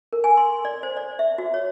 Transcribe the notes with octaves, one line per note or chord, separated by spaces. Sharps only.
A#4
G#5
C6
D5
C5
D5
E5
F#4
C#5